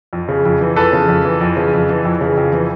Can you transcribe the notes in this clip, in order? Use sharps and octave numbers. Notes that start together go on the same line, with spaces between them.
F2
C#3
F2
E3
F2 A4 B4
C#3
F2
E3
F2
C#3
F2
E3
F2
C#3
F2
E3